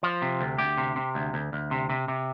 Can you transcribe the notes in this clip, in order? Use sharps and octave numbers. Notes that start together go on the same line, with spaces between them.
F3
C3
D2
D2 G4
C3
C3
D2
D2
D2
C3
C3
C3